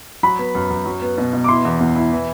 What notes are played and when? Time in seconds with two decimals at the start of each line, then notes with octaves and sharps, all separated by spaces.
0.23 F#3 B5
0.39 B3
0.55 F#2
0.70 F#2
0.86 F#3
1.02 B3
1.18 B2
1.33 B2
1.44 D6
1.48 E4 C6
1.65 E2
1.81 E2
1.96 E4
2.12 E3